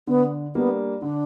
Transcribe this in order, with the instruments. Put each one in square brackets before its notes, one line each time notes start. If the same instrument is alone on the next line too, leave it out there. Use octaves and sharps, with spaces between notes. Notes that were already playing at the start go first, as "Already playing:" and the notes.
[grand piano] D3 [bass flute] B3
[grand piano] G3 A#3 D4 [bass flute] B3
[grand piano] D3 [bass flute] D4